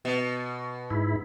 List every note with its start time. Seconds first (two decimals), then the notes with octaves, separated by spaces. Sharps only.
0.05 B2
0.90 G#2 E4